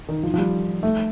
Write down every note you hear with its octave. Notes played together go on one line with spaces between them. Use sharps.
D#3
F3
F3
G3
A3